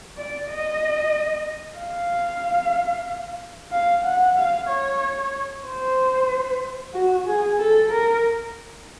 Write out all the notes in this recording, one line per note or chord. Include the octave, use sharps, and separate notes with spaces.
D5
D#5
F5
F5
F#5
F5
C#5
C5
F#4
G#4
A4
A#4